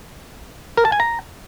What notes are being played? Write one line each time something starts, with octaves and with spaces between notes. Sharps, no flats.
A#4
A5
G#5
A#5